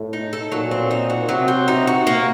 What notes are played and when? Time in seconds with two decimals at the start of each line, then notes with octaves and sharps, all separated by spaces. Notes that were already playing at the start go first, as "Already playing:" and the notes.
Already playing: A2
0.13 D#4
0.33 A4
0.52 A#2 F#3
0.71 C4
0.91 D#4
1.10 F#4
1.29 C3 F#3
1.48 C4
1.68 D#4
1.87 F#4
2.07 A#3